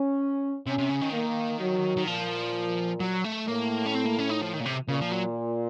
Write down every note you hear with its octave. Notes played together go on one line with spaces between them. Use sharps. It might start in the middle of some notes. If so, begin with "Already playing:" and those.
Already playing: C#4
C3 C#4
C3
C#3
D#3
A#3
F#3
D#3
A#2 F3
F#3
A3
A2 A#3
C#4
C4
A#3
C#4
D#4
F3
D#3
A#2
C3
A#2 C#3
F3
F#3